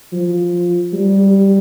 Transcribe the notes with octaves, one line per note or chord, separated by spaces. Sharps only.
F3
G3